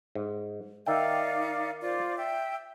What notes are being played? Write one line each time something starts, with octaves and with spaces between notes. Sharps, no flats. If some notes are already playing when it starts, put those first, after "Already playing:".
G#2
D#3 D#4 D5 E5 F5 G5
F4 C5 D5
E5 G5